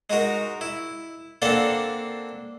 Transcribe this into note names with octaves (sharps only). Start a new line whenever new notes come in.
G#3 D#4 F#4 A#4
E4
A#3 C4 D4 A4 D5 F#5